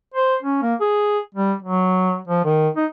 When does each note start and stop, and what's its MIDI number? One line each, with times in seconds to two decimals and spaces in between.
0.14 0.36 72
0.43 0.60 61
0.62 0.74 58
0.80 1.19 68
1.34 1.53 55
1.62 2.18 54
2.27 2.44 53
2.44 2.69 51
2.76 2.86 63